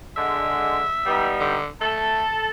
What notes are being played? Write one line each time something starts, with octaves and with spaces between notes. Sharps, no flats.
D3 G#3 E5
G3 B3 D#4
D3
A3 A4 A5